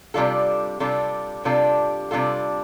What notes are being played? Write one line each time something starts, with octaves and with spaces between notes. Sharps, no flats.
C3 G3 D4 F4 A4
C3 G3 D4 F4 A4
C3 G3 D4 F4 A4
C3 G3 D4 F4 A4